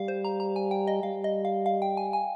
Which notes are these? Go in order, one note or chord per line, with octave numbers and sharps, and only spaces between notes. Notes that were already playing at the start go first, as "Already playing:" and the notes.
Already playing: G3 F5
C5
A#5
A#5
G#5
G5
D#5
G3 F5
D#5
F5
F5
G5
G#5
G#5